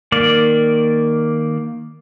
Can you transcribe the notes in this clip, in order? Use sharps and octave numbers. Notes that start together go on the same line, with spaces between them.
D#3 A#3 D5